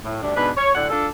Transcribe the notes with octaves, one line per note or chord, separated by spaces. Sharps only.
A2
D2 G2 D4
G#2 B2 D4 B4
C#5
D2 A2 D3 D4 F#5
D4 F4 A4